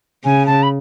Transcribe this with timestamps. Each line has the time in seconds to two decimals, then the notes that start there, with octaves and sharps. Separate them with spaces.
0.25 C#3 G#5
0.46 A5
0.63 B5